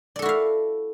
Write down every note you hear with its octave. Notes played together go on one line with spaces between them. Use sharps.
E4 F#4 A4 D5 F5